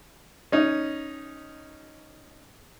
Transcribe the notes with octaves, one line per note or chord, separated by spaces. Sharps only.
C#4 D#4